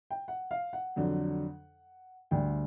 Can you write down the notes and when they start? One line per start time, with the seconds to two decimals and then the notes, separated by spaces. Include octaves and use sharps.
0.10 G5
0.28 F#5
0.51 F5
0.73 F#5
0.96 F2 D3 F#3
2.31 D2 D3 G3 G5